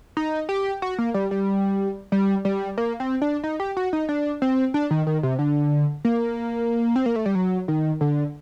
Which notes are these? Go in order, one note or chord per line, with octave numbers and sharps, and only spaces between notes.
D#4
G4
F#4
A#3
G3
G3
G3
G3
A#3
C4
D4
D#4
G4
F#4
D#4
D4
C4
D4
D#3
D#3
C3
D3
A#3
C4
A#3
A3
G3
F#3
D#3
D3